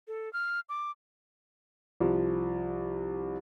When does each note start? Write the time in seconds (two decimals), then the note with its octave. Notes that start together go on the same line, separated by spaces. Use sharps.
0.08 A4
0.33 F6
0.69 D6
2.00 C2 F3